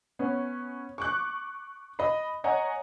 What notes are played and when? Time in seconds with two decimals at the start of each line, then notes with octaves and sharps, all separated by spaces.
0.19 B3 C#4
0.98 C#6 D6 F#6
1.99 D#5 B5
2.44 C#5 D#5 F#5 G#5 A#5